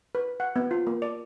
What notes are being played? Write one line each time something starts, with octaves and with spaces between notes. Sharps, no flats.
B4
F#5
B3
F4
A#3
D5